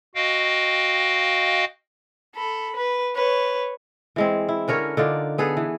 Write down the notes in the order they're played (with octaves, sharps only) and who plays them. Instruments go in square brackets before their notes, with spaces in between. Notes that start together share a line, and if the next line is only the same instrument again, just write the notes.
[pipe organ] F#4 D#5 F5 G5
[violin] A4 B5
B4
B4 C#5
[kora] E3 G#3 C4
E4
D3 C#4 A#4 C#5
D3 D#4 F4 D5
B3 G#4 A4 B4
E3